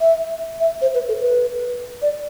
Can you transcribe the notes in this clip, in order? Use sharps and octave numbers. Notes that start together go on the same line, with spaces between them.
E5
E5
C5
B4
A4
B4
D5